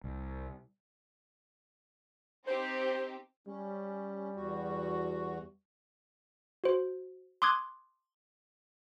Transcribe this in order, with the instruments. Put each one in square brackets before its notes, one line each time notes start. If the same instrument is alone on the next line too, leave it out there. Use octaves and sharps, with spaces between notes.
[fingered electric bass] C2
[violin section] C4 D#4 G4 [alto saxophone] C5
[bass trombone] G3 [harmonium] C#4
[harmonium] E2 F#4
[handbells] F#4 C5
C6 D6 D#6 F#6 G#6